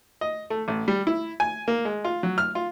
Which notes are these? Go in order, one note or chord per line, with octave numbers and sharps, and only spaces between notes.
D#5
A3
A1
G3
E4
G#5
A#3
G#3
F4
F#3
F6
F4